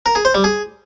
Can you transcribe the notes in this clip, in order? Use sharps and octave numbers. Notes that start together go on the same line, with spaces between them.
A#4
G#4
C5
G3
G#4